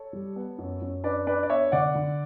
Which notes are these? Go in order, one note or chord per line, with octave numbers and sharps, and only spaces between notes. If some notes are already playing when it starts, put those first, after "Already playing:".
Already playing: A4 C#5
G3
B3
F#2
F#2
D4 B4 D5
D4 B4 D5
D5
B3 C#5 E5
D3 D5 F#5
D3